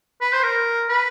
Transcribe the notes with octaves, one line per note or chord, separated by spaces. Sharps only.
B4
C5
A#4
B4